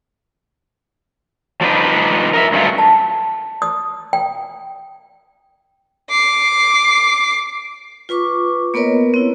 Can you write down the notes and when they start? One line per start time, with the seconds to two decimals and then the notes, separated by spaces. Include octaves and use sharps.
1.61 F3 G3 D4 D#4 B4
2.34 A#4 D#5 E5
2.53 G2 F#3 A3 C#4 F4
2.78 A5
3.62 D#6
4.13 G5
6.10 D6 C7
8.09 F4 B4 C#6 D6
8.74 A#3 B3 A#4 B4 C#5 D#5
9.14 C4 E4